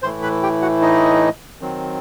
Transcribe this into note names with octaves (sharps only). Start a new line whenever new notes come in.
A2 E3 A3 E4 C5 C6
B4 B5
G4 G5
F#4 F#5
D#4 D#5
D#3 F#3 C4